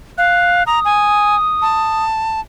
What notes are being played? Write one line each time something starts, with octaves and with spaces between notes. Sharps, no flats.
F5 F#6
A#5 D#6
G#5
A5